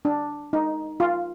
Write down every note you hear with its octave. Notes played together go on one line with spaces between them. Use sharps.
D4
D#4
F4